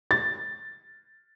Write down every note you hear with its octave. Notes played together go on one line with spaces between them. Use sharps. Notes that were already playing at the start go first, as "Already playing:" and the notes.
A6